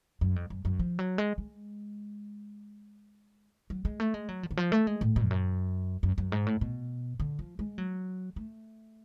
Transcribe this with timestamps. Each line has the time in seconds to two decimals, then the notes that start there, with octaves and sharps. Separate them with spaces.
0.21 F#2
0.36 F2
0.50 F#2
0.65 F#2
0.79 F3
0.99 F#3
1.18 G#3
1.38 G#3
3.70 F#3
3.85 G#3
4.00 A3
4.14 G#3
4.29 F#3
4.43 F3
4.51 D3
4.57 F3
4.72 A3
4.87 G#3
5.01 A2
5.16 B2
5.24 F2
5.31 F#2
6.03 F#2
6.18 F#2
6.32 G#2
6.47 A2
6.61 B2
7.20 D3
7.39 F3
7.59 G#3
7.78 F#3
8.36 A3